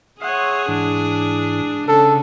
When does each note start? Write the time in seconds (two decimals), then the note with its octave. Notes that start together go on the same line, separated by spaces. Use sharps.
0.21 G#4 C#5 E5 F#5 C6 D#6
0.68 G#2 E3 D4
1.88 C#3 A4